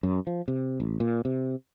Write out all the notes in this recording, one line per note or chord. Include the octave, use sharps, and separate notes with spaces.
F#2
F3
C3
A1
A#2
C3